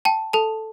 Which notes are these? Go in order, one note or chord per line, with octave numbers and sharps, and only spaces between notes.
G5 A5
A4 A5